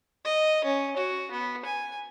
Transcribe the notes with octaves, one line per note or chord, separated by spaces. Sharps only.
D#5
C#4
F#4
B3
G#5